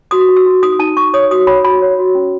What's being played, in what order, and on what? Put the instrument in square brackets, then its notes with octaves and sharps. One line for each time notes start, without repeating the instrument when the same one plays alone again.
[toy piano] F#4 D#6
F#4
E6
F#4
D#4 D#6
D#4 A5
D#4 C#6
C#5 D#6
F#4 D#6
C#5 B5
F#4 B5
C#5
F#4
C#4